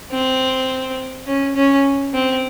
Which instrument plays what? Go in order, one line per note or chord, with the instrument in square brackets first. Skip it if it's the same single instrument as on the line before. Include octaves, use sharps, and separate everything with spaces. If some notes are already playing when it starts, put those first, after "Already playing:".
[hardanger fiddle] C4
C#4
C#4
C4